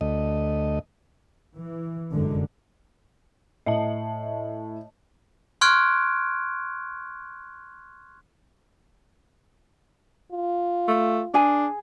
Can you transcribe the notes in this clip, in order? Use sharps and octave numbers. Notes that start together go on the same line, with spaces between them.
D2 A3 D#5
E3
F1 F#2 D3 G#3
A2 D#5 E5 A5
C6 C#6 F6 F#6 G#6 D7
F4
A3
D4 G#4 G#5